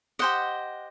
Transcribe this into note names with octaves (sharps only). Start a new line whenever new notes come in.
G4 C5 D#5 F#5